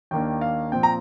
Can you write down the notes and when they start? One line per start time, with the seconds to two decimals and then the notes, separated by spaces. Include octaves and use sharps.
0.11 D#2 D#3 A#3 D4 G5
0.41 F5
0.72 A#2 F3 C4 G5
0.83 A#5